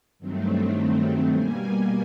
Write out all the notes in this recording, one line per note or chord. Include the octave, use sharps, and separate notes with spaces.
G2 D#3 F#3 A3 C4
B2 G3 A#3 G#5